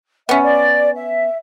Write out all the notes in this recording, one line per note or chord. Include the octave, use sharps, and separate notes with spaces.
B3 C#4 E5
D5
E5